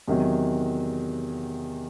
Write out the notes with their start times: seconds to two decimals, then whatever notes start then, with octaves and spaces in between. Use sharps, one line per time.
0.08 E2 C3 D#3 F#3